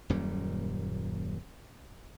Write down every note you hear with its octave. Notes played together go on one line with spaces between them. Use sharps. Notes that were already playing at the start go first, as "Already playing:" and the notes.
D#1 F#2 A#2 G3